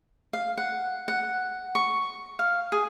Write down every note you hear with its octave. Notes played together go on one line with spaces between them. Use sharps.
F5
F#5
F#5
C#6
F5
G#4